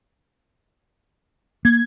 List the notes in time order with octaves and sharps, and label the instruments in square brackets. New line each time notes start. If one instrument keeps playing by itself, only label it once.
[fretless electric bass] A#3 [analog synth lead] G#6